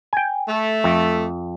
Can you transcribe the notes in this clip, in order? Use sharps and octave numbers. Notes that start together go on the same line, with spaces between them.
G5 G#5
A3
F2